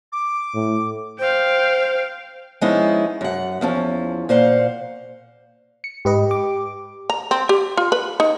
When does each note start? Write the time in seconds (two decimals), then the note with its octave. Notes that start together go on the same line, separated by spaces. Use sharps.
0.12 D6
0.54 A2
1.19 C5 F5 G5
2.61 F3 G#3 B3 C#4 D#4 E4
3.21 F#2 F#5
3.61 E2 F3 C#4
4.29 A#2 C5 F5 F#5
5.84 C#7
6.05 G#2 G4 B4 D#5
6.31 D6
7.10 A#5
7.31 C4
7.49 G4
7.77 F4
7.92 B4
8.20 D#4